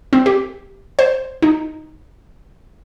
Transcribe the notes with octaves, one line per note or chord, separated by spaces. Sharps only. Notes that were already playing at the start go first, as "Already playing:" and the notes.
C4
G4
C5
D#4